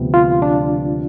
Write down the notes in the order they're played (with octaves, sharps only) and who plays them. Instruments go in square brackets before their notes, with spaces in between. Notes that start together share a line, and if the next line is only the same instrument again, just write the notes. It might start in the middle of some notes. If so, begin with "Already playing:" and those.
Already playing: [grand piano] D2 C3 F3 B3
[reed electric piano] F4
D4